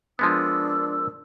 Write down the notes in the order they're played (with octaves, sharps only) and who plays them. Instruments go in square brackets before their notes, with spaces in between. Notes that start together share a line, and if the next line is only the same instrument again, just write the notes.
[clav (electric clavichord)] F3 G#3 B3 [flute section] D4 A#4 E6